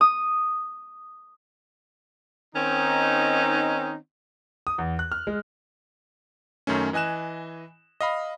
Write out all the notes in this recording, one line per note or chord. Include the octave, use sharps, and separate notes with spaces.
D#6
D#3 C4 C#4 D#4
D#6
E2
F#6
F6
G#3
F#2 D#3 A3 C#4
E3 D#5 G#5 F#6 E7
D#5 F5 B5